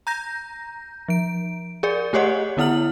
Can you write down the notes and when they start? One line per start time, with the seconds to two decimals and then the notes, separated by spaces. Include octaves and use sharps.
0.07 A#5 G6 A#6
1.08 F3 D7
1.83 G#4 A#4 D5
2.13 A3 G4 G#4 C#5 D#5 F#5
2.57 D3 B3 E4 F#5 F6 F#7